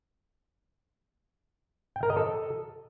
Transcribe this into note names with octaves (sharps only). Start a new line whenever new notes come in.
G5
A#4
D#5
A4